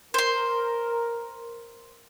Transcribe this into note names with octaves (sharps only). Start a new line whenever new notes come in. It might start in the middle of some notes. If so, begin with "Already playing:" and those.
A#4 C5 C6